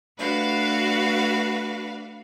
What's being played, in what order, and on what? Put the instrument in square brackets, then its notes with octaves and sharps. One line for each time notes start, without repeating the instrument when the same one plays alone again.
[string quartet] A3 D4 F#4 B4 F5